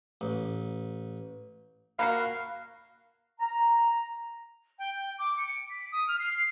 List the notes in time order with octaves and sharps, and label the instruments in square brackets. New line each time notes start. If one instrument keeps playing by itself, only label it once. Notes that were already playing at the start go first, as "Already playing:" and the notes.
[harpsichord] A1
[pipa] A#3 F#4 A#4 [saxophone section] F5 [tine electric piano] B5 F#6 C7
[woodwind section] A#5
[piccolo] G5
G5
D6
C#7
D7
B6
D#6
F6
C7